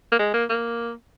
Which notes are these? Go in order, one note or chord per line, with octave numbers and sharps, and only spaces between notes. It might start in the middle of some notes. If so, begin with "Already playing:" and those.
A#3
G#3
A#3
A#3